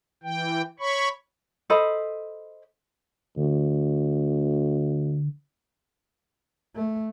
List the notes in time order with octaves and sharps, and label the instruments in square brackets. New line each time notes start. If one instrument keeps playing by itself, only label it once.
[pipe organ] E3 G5
C#5 B5 C#6
[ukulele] A4 C5 D#5 B5
[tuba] D2 [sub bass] D3
[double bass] A3